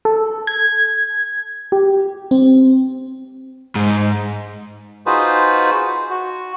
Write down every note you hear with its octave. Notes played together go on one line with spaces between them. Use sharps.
A4
G#6
G4
C4
G#2
D#4 F4 F#4 G#4 B4 C5
F#4